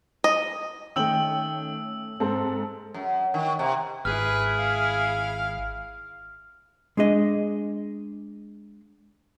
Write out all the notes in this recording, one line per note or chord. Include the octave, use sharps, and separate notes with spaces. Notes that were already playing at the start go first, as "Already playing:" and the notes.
D#5
D#3 A3 C#4 G5 E6 F#7
G#2 C4 A4 A5
F#2
D#3
C3
G#1 E4 G#4 B4 F6
F5
G#3 D4 G#4 D#5